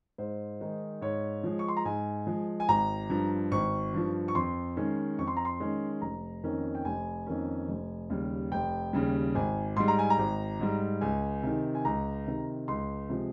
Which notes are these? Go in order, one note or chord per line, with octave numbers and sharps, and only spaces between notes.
G#2 C5
D#3 G#3 D#4
G#2 C#5
F3 G#3
C#6
C6
A#5
G#2 G#5
F3 G#3
G#5
G#1 A#5
G2 F3
G#1 C#6
G2 F3
C#6
F2 C6
D#3 G#3 C#4
F2 C#6
C6
A#5
C6
D#3 G#3 C#4
F1 A#5
F2 D#3 A#3 C#4
G5
F1 G#5
F2 D#3 A#3 C#4
F1
D#2 C#3 G3
F1 G5
D#2 C#3 G3
G#1 G#5
G#2 G3 C6
A#5
G#5
A#5
G#1
G#2 G3
C#2 G#5
C3 D#3
G#5
C#2 A#5
C3 D#3
C#2 C6
C3 F3 G#3